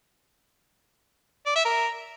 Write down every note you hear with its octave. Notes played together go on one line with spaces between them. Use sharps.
D5
E5
A#4